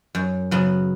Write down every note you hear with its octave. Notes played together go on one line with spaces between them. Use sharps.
F#2
C#3 F#3 B3